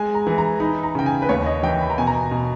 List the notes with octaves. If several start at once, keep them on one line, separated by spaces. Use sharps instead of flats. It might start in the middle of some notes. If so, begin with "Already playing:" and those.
Already playing: G#3 G#5
A#5
E3
A#5
D#4 B5
A#5
C#3 G5
G#5
B4
D#2 C#5
D#5
E3 G5
B5
A#5
B2 G#5
A#5
B2